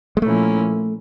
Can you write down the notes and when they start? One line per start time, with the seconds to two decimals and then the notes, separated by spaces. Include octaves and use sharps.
0.17 G#3
0.22 A#2 F3 A3 A#3 C#4 E4